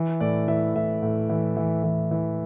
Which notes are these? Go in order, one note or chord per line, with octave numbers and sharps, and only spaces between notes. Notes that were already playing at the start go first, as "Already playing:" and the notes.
Already playing: E3
A2 D5
E3 E5
A2 E5
A2
E3
E3
E3
E3